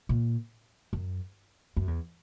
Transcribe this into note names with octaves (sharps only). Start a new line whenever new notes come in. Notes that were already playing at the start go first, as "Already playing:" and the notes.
A#2
F#2
F#2
E2